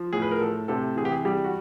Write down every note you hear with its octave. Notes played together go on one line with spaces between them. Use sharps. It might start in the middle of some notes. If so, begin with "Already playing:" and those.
Already playing: F3
A2 G#4
B4
A#4
A2 A4
C3 A4
E3 G#4
G4
G#4
G3 G4
F#4